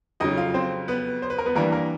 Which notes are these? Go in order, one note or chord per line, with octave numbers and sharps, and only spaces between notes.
F2 C#3 F#3 D#4 D#5
F4 F5
C4 C5
B3 B4
C5
B4
A#4
B3 B4
G2 E3 G3 A#3 A#4
A#3 A#4